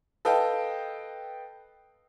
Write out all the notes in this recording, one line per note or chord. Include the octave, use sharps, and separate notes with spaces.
A4 B4 D#5 F5 G5